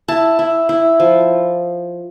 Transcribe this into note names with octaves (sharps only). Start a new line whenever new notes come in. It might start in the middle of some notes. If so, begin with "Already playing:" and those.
E4 A5
E4
E4
F3